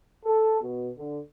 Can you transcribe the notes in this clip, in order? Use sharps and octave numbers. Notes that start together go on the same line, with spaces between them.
A4
B2
D3